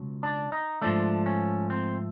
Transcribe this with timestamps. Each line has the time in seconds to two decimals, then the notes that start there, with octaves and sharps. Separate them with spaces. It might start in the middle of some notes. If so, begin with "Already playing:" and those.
Already playing: C#2 B2 F#3
0.23 D4
0.52 D#4
0.82 G#2 F3 A3 D4
1.26 C#4
1.70 C4